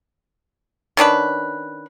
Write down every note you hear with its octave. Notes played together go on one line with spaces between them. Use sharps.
D#3 C#4 D4 B4